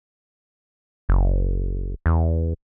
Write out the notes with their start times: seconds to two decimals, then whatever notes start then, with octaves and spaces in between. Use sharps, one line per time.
1.09 F#1
2.06 E2